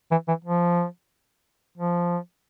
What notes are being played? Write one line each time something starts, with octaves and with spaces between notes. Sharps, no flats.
E3
E3
F3
F3